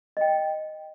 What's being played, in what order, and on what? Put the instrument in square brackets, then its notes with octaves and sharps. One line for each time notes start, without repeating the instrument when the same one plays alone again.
[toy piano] D#5 G5